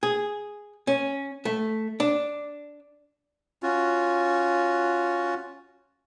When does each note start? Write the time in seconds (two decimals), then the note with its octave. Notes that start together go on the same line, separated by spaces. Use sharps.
0.03 G#4
0.87 C#4
1.45 A3
2.00 D4
3.63 C#4 F4 F#4